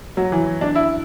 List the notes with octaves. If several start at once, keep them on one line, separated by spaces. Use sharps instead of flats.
F#3
E3
D4
E4